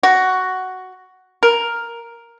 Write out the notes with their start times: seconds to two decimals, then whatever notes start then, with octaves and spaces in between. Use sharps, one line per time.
0.03 F#4
1.43 A#4